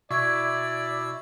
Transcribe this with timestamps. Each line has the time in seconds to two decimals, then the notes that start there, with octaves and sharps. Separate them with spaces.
0.11 B2 E4 D5 C#6 E6 G#6